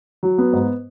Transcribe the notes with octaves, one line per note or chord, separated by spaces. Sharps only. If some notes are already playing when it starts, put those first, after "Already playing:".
F#3
B3
G#2